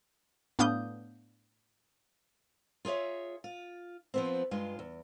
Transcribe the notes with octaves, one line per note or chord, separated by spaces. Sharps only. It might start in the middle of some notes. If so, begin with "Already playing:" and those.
A2 B3 D4 F5 D#6 G6
F4 G#4 A4 C#5 E5
F4
F3 B3 C4
G2 G#3 F4
E2